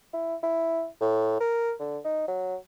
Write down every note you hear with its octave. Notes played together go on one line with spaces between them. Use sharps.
E4
E4
A2
A#4
D3
D#4
F#3